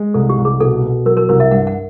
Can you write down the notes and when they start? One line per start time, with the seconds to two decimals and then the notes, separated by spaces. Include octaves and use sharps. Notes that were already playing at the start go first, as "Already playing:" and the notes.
Already playing: G#3
0.14 C2 A4
0.29 G4
0.38 C2
0.45 G#4
0.60 B2 A4
0.83 B2
1.05 F#3 A#4
1.17 A#4
1.29 C2 A#4
1.40 E5
1.51 G2 F#5
1.67 F#5